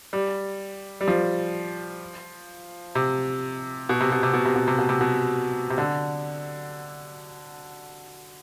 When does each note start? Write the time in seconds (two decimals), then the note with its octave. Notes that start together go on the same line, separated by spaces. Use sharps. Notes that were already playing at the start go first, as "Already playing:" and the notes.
0.13 G3
1.01 G3
1.08 F3
2.95 C3
3.89 B2
4.01 C3
4.12 B2
4.23 C3
4.33 B2
4.45 C3
4.56 B2
4.68 C3
4.78 B2
4.89 C3
5.01 B2
5.70 C3
5.78 D3